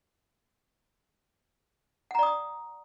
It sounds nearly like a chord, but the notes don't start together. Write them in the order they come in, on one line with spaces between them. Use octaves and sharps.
F#5 A#5 D5 D#6